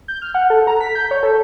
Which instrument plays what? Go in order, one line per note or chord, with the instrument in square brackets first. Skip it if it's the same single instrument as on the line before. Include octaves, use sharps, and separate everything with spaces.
[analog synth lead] G6
F6
F#5
A4
A#5
B6
G6
C#5
A4